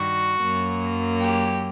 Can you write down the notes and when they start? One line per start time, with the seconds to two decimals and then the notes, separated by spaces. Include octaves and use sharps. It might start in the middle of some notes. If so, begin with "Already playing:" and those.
Already playing: G2 D#3 G3 F#4
0.40 F#2 F#3 A#3
1.19 G4